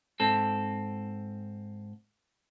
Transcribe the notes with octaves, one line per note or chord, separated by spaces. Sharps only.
G#2 C4 A4